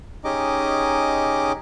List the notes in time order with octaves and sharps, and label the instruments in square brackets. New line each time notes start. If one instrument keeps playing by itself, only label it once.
[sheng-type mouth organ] C#4 D#4 G4 G#4 D#5 D6